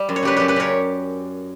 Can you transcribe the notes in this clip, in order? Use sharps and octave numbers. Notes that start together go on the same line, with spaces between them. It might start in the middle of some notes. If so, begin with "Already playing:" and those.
Already playing: G3
F#2
C#5
C#3 G4 B4
F#2 G4 B4
G4 B4
C#3 A#4 C#5